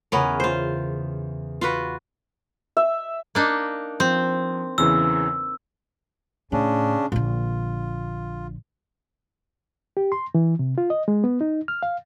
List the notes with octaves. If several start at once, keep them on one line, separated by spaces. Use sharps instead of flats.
E2 C#3 B3 C#4 A#4
F4 C5
F4 F#4 B4
E5
A#3 D4 D#4
F3 C4
E2 C#3 E3 E6
A2 C#3 C#4 D4
A#1 D3 F4
G4
C6
E3
C3
F4
D#5
G#3
B3
D#4
F6
F5